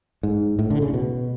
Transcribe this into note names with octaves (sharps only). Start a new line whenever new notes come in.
G#2
A2
D3
C#3
B2